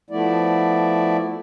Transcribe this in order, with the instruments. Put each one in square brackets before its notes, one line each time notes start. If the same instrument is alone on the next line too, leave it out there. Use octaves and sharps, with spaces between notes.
[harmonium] F3 A3 B3 E4 D5